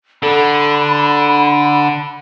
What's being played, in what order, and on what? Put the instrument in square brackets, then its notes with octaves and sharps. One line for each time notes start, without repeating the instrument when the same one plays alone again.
[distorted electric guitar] D3 [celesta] A4 [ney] B5